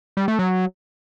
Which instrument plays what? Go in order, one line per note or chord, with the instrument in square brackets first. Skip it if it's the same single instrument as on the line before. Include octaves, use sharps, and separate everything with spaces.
[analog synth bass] G3
A3
F#3